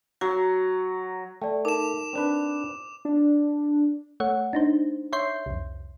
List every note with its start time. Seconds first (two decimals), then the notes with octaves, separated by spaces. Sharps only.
0.21 F#3
1.42 A3 D5 G5
1.65 D#4 A#4 A5 D6 E7
2.13 C4 D4 B4
3.05 D4
4.20 A3 C#5 F#5
4.53 D4 D#4 C5
5.13 C#5 E5 C6 G6 C7
5.46 C2 F2